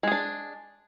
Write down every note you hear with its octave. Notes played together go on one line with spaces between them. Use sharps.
G#3 D4 G#4